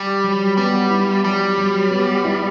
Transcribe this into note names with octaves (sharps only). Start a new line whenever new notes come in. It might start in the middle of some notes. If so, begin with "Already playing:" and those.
Already playing: G3
F#3
G3 B3
E4
F#3 G3
F#3
B3
E4